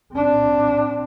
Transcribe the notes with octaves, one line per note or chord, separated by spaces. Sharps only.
C4 D4